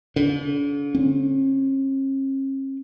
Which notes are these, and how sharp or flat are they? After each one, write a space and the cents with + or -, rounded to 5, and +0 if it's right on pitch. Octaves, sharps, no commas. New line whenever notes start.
D3 -45
C#4 -45